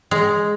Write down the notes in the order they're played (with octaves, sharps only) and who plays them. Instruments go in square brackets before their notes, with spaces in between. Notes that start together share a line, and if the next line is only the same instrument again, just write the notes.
[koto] G#3